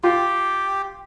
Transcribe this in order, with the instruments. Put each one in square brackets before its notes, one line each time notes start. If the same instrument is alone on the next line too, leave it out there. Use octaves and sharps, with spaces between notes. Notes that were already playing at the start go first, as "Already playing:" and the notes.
[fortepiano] F4 [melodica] G4